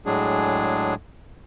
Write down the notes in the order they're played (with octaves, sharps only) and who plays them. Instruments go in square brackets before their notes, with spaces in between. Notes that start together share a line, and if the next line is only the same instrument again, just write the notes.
[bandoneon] A2 F#3 G#3 D4 G#4